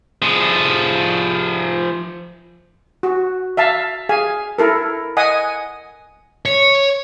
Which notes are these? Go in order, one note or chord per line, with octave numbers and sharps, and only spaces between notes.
F3 G#4
F#4
E5 F5 A5
G#4 F5 G#5
E4 A4 A#4
D#5 F#5 G#5 D#6
C#5